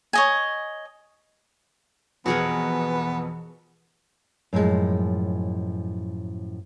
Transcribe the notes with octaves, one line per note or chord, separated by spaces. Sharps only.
C#5 D#5 G#5
F2 B2 E3 B3 F#4 G#4 A#4
F#2 A2 F3 G#3